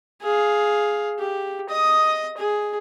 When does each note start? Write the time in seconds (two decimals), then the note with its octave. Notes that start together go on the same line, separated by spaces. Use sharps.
0.22 G#4 F5
1.19 G4
1.69 D#5 D#6
2.37 G#4